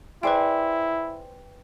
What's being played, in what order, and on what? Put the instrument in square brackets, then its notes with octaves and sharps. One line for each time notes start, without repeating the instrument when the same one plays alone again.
[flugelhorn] E4 [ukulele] G#4 C5 D5 [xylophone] B4 G5